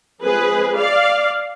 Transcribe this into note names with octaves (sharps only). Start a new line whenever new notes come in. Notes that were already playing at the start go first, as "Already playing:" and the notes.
F3 G#3 C4 G#4 B4
D5 F5